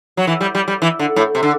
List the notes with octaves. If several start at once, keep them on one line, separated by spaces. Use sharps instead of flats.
F#3
E3
G3
G3
G3
E3
D3
A2
C3
D3